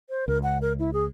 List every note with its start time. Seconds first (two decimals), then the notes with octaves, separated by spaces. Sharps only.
0.10 C5
0.28 C#2 A#4
0.43 F#5
0.62 A#4
0.79 E4
0.93 G#4